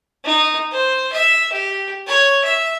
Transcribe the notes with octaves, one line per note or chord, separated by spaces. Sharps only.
D#4
C5
E5
G4
C#5
E5